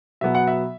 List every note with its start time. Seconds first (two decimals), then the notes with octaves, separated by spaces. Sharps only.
0.21 B2 F#3 B3 E5
0.35 F#5
0.47 E5